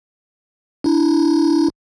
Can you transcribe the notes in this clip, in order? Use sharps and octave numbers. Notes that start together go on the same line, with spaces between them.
D4 E4